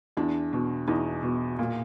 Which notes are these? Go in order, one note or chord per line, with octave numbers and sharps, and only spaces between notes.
E2 D4
B2
E2 D#4
B2
A#2